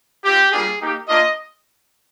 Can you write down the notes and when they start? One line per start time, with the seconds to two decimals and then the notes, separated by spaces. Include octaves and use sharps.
0.24 C4 F4 G4
0.52 G3 A#3 D4 F4 G#4
0.80 A#3 D#4 G4
1.08 A#3 D4 F4 D#5